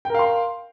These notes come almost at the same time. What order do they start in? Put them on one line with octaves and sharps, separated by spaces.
G5 A#4 F5 C6